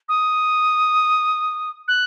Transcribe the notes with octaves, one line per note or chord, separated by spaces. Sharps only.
D#6
F#6